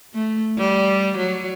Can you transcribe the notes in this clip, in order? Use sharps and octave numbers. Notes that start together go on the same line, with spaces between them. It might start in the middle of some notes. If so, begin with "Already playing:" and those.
A3
G3
F#3